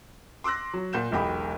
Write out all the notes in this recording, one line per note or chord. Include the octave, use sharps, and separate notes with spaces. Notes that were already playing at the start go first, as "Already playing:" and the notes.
C6 D6 E6 F#6 A#6
F#3
A#2 F#5 G6 E7
E1 B1 G#3 G4 F#5 B5